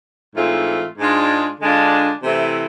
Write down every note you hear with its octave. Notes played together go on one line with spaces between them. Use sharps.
G#2 E3 A3 C4 F4
G#2 G#3 D4 F4
D3 G#3 D4 F4
C3 E3 A3 C4 E4